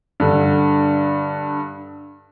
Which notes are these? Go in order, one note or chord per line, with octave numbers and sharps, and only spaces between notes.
G2 D3